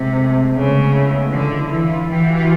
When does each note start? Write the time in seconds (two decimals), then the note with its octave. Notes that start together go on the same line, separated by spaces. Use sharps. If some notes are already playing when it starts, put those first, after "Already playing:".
Already playing: C3 G#3
0.16 A3
0.54 C#3 B3
0.94 E4
1.32 D3 F4
1.58 E4
1.71 E3
1.83 F4
2.09 E3 G4
2.22 F#4
2.34 F4